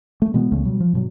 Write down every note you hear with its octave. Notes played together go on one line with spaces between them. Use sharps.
A3
B2 E3 G#3 B3
C#2 C#3 A3 B3
B2 F#3 G3
F3
G2 B2 F#3